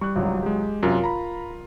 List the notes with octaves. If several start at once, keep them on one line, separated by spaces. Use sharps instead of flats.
G3 C#6 F#6
G#1 C#2 F#3
G#3 G4
F#2 C3 F4 A#4
A#5 B5